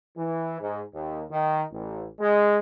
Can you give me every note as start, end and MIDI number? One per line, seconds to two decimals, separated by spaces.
0.17 0.60 52
0.61 0.82 44
0.94 1.24 39
1.31 1.61 51
1.72 2.08 33
2.20 2.58 56